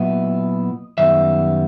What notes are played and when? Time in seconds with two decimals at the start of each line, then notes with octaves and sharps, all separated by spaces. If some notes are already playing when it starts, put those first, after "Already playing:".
Already playing: A#2 F#3 B3 E4 D#5
0.98 F#2 D#3 G3 B3 E5